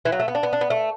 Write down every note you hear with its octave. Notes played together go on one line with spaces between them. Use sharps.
E3
F#3
A3
B3
D4
B3
D4
B3
A3